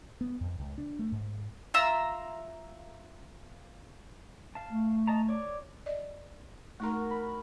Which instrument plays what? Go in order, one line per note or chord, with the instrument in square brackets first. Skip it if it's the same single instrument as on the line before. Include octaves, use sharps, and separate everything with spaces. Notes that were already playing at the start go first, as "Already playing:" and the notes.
[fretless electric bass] B3
F2
C#2
D4
A3
G#2
[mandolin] F4 E5 A#5 E6
[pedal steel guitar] F5 A5
[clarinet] A3
[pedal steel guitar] D#5 A5 A#5
C#5 D5
[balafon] D5 D#5
[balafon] A3 D#4 C6 [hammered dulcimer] F#4 A#4
[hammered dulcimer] B5